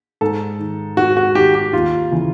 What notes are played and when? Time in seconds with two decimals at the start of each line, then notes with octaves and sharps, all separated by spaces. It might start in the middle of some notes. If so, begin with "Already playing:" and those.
0.21 G#2 A4
0.59 D#3
0.97 G#2 F#4
1.17 F#4
1.35 D#3 G4
1.54 G4
1.73 D#2 F4
2.11 C#3 E3